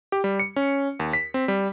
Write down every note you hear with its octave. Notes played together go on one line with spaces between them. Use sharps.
G4
G3
C#7
C#4
D#2
B6
C4
G3